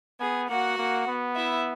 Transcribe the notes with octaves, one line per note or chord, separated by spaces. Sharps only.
B3 G#4 G#5
A#3 F#4 F#5
A#3
B3
E4 E5